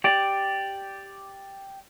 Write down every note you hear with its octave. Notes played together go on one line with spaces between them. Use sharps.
G4 D5